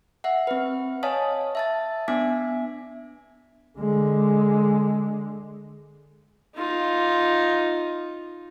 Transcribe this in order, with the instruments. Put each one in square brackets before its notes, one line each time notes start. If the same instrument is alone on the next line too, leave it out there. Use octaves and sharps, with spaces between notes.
[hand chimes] E5 F#5
C4 B4
C#5 D#5 F5 G#5 A5 D#6
E5 A5 A6
B3 D4 E5 G#5 D6 B6
[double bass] D3 G#3
[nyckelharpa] D#4 F4